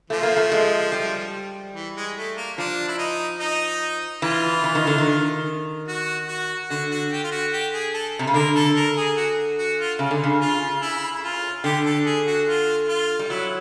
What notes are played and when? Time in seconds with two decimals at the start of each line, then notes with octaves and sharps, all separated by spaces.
0.10 F3 A3
0.23 A#3
0.37 A3
0.52 G#3
0.92 G3
1.74 E3
1.96 G#3
2.16 A3
2.37 A#3
2.57 F3 D4
2.88 E4
2.98 D#4
3.40 D#4
4.22 E3 F4
4.64 E3
4.75 D#3
4.87 D3
4.98 D#3
5.88 F#4
6.28 F#4
6.69 D3 F#4
6.91 F#4
7.11 G4
7.24 F4
7.32 F#4
7.53 G4
7.73 G#4
7.94 A4
8.19 C3
8.27 C#3
8.34 D3 A#4
8.55 A4
8.76 A#4
8.97 G#4
9.17 F#4
9.59 F#4
9.79 F4
9.99 C#3
10.11 D3
10.24 C#3
10.41 F4
10.82 E4
11.23 F4
11.64 D3 G4
11.86 A4
12.05 G#4
12.27 F#4
12.47 F4
12.88 F4
13.19 G3
13.30 F#3 E4